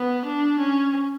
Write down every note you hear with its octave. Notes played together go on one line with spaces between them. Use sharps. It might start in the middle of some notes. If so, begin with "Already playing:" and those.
Already playing: B3
D4
C#4